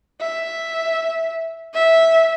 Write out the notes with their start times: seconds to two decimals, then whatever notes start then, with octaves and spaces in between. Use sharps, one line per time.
0.21 E5
1.74 E5